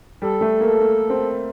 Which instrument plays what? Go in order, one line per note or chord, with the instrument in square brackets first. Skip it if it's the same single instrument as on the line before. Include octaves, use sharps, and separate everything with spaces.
[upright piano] G3 [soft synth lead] A4
[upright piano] A3
A#3
A#3
C4